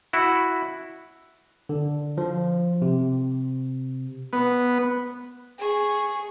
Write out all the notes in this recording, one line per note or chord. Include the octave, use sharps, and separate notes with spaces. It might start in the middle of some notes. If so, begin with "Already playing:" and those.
E4 F#4
D3
F3
C3
B3
G#4 C#6